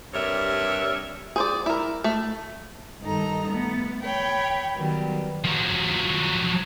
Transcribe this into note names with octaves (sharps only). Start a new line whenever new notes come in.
G2 C3 A#4 C#5 E5
G#4 C5 D5
E4 A#4
A3
G2 D#3 D#4 A4 A#5
A3 B3
C#5 G5 B5
D#3 F#3 G3 B3
F3 F#3